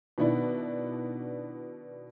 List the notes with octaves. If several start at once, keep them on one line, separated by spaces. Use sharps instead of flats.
B2 D#3 B3 D4 E4